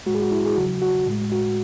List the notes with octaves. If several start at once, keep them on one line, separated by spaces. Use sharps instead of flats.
A2 G#3 F#4
G#4
F#4
E4
G#4
E2 C#3 F#3 F#4
F#4
A2 G#3
F#4